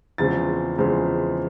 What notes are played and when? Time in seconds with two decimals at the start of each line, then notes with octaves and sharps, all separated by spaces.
0.18 E2 C#3 F3 G#3 C4 A6
0.78 E2 C#3 F3 G#3 C4